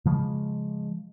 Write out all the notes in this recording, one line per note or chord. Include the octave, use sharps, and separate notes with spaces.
C#3 F3 G#3